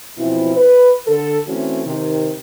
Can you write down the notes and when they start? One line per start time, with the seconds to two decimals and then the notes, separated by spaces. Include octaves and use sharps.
0.18 B2 E3 F3 C4 E4
0.56 B4
1.07 D3 A4
1.47 E3 A3 C4 C#4 F#4
1.86 C3 D#3